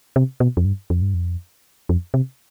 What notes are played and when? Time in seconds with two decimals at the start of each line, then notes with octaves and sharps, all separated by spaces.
0.16 C3
0.40 B2
0.57 F2
0.65 G2
0.90 F2
1.02 G2
1.14 F2
1.89 F2
2.14 C3